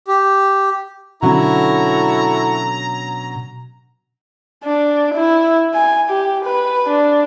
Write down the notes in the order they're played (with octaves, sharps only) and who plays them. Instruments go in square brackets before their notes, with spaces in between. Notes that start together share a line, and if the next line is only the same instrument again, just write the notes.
[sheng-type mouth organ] G4
[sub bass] B2 [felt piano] D3 F#3 C#4 [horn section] E4 F#4 A4 [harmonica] A#5
[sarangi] D4
E4
G#5
G4
B4
D4